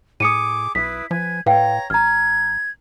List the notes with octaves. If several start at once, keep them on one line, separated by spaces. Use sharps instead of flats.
A2 G#4 D6 D#6 C#7 D#7
B1 E4 B4 D#6 B6
F3 B4 G#5 G#6
A2 B4 C#5 F5 G5 A#5
A1 A#5 F6 G#6